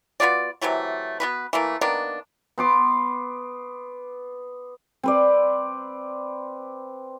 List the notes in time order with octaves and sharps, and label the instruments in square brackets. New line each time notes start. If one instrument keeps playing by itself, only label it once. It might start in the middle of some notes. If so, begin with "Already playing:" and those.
[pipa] B3 F4 F#4 D5
C3 E3 F#3 A3
B3 F#4 B4
E3 A3 A#3
D#3 A#3 B3 D4
[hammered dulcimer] B3 C6 D6
C4 B4 D5